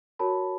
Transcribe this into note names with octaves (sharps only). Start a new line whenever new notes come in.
F#4 A#4 C#5 A5 B5